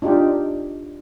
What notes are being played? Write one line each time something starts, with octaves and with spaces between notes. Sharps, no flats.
D4 D#4 F4 G4